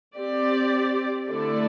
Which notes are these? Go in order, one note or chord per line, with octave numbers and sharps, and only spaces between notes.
C4 G4 D5
D3 A3 E4 A4 D5